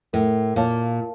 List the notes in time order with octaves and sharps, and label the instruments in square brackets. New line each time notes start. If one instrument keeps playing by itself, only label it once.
[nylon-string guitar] A2 [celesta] A#4
[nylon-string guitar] A#2 [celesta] C#5 F5 A5